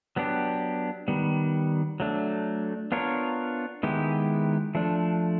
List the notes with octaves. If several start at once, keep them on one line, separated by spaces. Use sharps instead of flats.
F#3 B3 D4 G4
D#3 G3 B3
F#3 A3 D4
B3 D4 F4 A#4 C#5
D#3 G#3 B3 E4 G4
F3 A3 D4